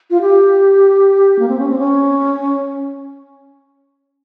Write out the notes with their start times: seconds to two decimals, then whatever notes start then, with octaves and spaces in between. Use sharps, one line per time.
0.10 F4
0.21 G4
1.39 A#3
1.48 C4
1.58 C#4
1.69 C4
1.79 C#4